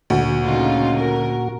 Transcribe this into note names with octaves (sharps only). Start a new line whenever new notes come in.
D2 A#2 F#4
C#3 D#4 F4
A#4